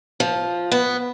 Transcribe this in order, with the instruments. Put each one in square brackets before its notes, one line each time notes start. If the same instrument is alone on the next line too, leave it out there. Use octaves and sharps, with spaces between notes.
[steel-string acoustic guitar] F3
B3